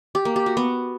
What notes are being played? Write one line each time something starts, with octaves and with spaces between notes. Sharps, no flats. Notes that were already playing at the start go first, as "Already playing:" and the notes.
G4
A#3
G4
F#4
B3